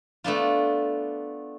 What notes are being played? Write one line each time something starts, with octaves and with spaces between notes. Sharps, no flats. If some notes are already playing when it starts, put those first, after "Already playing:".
A3 B3 D4 F4